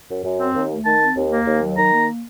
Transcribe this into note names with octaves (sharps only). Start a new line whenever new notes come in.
F#2
F#2
C4
D#2
A3
D#3 A5
C4
D#2
A#3
D#2
F#3
D#3 A#5
A#3